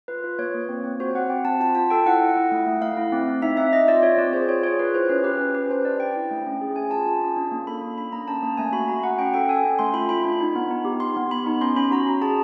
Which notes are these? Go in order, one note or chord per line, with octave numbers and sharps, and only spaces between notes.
F4 B4
F4
A#3 C#5
A#3
C4
C4
F#4 C5
C4 F#5
C4 G5
C4 A5
F4 A5
F4 A5
A4 G5
E4 F#5
E4
E4
A3
A3
A3 F5
E4
C4
C4
D#4 E5
C4 E5
C4 D#5
F4 D5
F4 C#5
C4 D5
G#4 C5
F4 C#5
G#4 C#5
F4 B4
E4 C5
C#4 B4
G4 B4
C#4
G4 B4
D4 C5
D4 D5
D4 G5
E4
A3
C#4
G#4
G#4 G#5
F4 A5
F4
C#4
D4
A#3
A4 B5
D4
C#4 B5
A#3 A#5
C#4 A5
A#3
A3 G#5
F#4 B5
F#4 A#5
F#4 F#5
C#4 G5
A4 G5
A4 G#5
C#4
A3 C6
F4 B5
F4 B5
D4
D#4
B3
D#4
G4
G4 C6
B3
B3 B5
D#4
C#4 C6
C#4 B5
F#4 A#5
F#4
G#4 A5